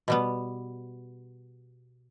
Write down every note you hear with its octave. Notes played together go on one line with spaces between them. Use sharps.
B2 G3 B3